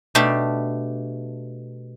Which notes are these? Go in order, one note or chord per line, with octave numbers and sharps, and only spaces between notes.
B2 A3 D4 G4